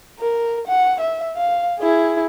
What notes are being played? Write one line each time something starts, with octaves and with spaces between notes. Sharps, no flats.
A#4
F#5
E5
F5
E4 G#4